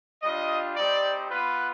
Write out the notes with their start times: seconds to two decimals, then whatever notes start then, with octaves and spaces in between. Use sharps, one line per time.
0.23 G3 D4 F4 D#5
0.76 G3 C4 D#4 G4 D5
1.30 B3 F4 B4